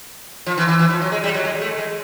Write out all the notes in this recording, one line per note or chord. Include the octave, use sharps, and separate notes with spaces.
F3
E3
E3
E3
F3
F#3
G#3
G3
F#3
G#3
A3
G#3